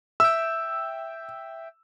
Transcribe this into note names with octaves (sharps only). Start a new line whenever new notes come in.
E5 G5 E6